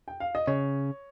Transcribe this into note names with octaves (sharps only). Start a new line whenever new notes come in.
G5
F5
D#5
C#3 C#5